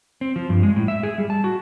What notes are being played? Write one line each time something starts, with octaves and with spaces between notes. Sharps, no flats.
C4
F3
G2
G#3
A2
E5
G#4
G3
A5
F#4